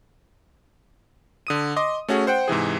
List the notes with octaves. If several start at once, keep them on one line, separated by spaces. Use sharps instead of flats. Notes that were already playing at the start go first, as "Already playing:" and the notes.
D3 D#6 D#7
D#5 C6 D6
A3 C#4 F#4 G#4
C5 F#5 G5
G#2 C3 E3 G#4